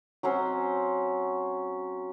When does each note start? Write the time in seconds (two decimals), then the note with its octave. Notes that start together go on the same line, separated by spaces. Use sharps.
0.23 F#3 C4 C#4 C5